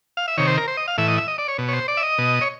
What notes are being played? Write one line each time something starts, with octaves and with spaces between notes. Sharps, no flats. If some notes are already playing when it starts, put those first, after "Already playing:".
F5
E5
C3 D#3 C#5
C5
A#4
C5
D#5
F5
A2 E3 E5
D#5
E5
D#5
D5
C#5
B2
C#5
C5
D5
E5
D#5
B2
C#5